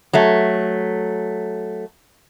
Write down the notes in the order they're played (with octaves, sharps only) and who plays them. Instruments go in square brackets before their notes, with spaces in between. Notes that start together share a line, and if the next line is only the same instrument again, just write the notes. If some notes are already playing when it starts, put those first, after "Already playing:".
[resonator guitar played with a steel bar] F#3 A3